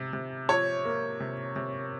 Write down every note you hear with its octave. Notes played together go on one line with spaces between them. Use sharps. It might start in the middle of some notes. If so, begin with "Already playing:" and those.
Already playing: C3
C3
F3 C#5
A#3
C3
C3